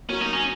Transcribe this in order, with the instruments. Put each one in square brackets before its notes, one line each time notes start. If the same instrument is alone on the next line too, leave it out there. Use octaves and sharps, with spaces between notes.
[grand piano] F#3 A#3 [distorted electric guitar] C#4
[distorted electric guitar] D#4
C#4